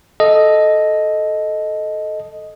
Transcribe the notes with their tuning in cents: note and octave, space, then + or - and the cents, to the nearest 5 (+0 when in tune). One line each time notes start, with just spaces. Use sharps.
A4 -10 D#5 +0